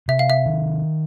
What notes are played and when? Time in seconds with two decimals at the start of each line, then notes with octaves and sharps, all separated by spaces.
0.08 C3 E5
0.19 F5
0.30 E5
0.46 D#3